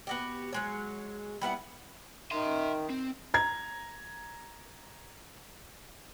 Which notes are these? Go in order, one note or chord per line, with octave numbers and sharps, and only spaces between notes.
B3 F#4 G4
F#3 G#3 C#5
G3 B3 E4 F#5
D#3 E5 C6
C4
A#5 G#6